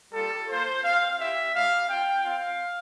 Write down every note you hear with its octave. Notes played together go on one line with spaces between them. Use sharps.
G3 A#3 F4 A4
A#3 F4 C5
C4 F4 F5
C4 E4 G4 E5
G3 D4 G4 F5
C4 F4 G5
C4 F4 F5